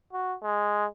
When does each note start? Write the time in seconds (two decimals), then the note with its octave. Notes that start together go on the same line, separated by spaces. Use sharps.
0.13 F#4
0.43 G#3